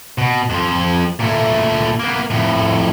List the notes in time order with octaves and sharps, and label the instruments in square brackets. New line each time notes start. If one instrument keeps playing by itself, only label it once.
[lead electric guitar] B2
F2 F3
A#2 A3
A#3 B3
F2 A2